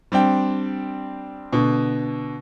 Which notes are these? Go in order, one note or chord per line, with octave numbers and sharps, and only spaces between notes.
G3 C4 D4 G5
B2 D3